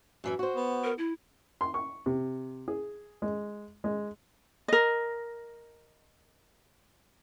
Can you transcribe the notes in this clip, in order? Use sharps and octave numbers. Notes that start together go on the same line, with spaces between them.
F#2 E3 E5
F#4 C5
B3
A#4
E4
C6
C#6
C3
G#4
G#3
G#3
A#4 D#5